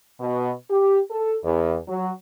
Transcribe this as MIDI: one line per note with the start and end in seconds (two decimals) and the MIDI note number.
0.20 0.51 47
0.70 1.00 67
1.10 1.37 69
1.43 1.76 40
1.87 2.11 54